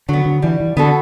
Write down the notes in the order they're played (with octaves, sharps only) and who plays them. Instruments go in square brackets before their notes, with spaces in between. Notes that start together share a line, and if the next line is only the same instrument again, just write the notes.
[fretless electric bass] D3 [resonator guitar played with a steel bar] F#3 B3
[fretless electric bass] D3
[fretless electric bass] E3 [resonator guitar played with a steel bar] G3
[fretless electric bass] E3
[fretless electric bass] D3 [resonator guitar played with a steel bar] B3 F#4 A4